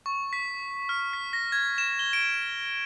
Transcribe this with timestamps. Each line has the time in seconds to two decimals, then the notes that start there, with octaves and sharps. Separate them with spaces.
0.06 C#6
0.33 B6
0.89 F6
1.13 B6
1.33 A#6
1.52 G#6
1.78 E7
1.99 G7
2.13 D7